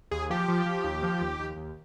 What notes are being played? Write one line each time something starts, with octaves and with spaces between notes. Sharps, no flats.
D#2 G#4
F3 G4
F3
F3
D#2
F3
D#2
D#2
D#2